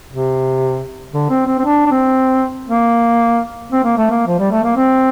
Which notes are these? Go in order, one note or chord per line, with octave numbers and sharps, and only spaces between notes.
C3
D3
C4
C4
C4
D4
D4
C4
A#3
C4
A#3
A3
A#3
F3
G3
A3
A#3
C4